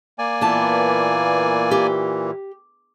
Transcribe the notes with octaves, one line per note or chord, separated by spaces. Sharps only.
A#3 D5 G#5
A#2 E3 B3 A5
G4